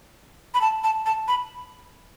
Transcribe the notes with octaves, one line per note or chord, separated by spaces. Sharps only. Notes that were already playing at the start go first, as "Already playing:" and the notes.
B5
A5
A5
A5
B5